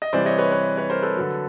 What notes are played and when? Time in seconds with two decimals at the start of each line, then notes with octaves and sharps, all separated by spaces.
0.02 D#5
0.13 C3 E3 G3 C5 D5
0.25 C#5 D#5
0.38 B4 C#5
0.52 B4 C#5
0.77 B4 C#5
0.90 A#4 C5
1.03 A4 B4
1.16 D3 F#3